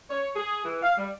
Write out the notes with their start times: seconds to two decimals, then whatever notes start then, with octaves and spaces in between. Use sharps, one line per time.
0.10 C#5
0.35 G#4
0.65 E3
0.82 F5
0.97 G3